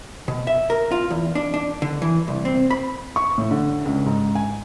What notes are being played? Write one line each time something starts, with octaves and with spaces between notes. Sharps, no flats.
B2
E5
A#4
F4
E2
D4
D4
D3
E3
C2
C4
B5
C#6
A2
D3
C#2
G#2
G#5